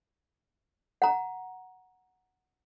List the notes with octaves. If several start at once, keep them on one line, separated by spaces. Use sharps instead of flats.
F#5 A#5